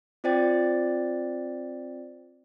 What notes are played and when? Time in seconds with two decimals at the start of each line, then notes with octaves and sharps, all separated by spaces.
0.24 C4 F4 C5 D5 G5 A6